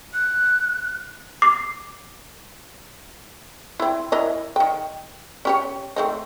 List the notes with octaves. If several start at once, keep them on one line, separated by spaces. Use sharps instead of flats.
F#6
D6 C7
C4 E4
E4 A#4 D#5
D#3 G5
C#4 G4 C#5
A3 C4 D#4